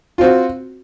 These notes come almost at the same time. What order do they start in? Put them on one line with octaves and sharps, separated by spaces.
F4 C4 F#4